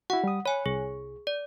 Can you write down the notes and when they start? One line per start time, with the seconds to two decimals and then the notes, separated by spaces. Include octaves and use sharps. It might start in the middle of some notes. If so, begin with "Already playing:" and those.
0.10 E4 F#4 F#5
0.24 G3 D#6
0.46 C#5 G#5 B5
0.66 C2 G#4
1.27 D5